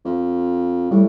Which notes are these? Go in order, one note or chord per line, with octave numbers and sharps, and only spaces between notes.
F2
A2 G3